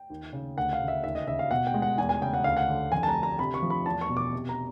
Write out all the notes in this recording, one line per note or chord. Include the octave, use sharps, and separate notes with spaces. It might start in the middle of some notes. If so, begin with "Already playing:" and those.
Already playing: G5
D#2
C#3
D2 F#5
F5
C#3
E5
D#2 E5
D#5
C#3 E5
F5
B2 F#5
G5
G#3
F#5
E2 G#5
G#5
C#3 G5
F#5
D2 F5
F#5
D3
F2 G#5
A5
A#5
D3
A#5
C3 B5
C#6
F3
B5
E2 A5
C#6
B2
D6
C3
A#5